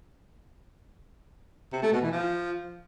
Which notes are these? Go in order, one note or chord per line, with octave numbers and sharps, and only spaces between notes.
C3
A3
B2
E3
F3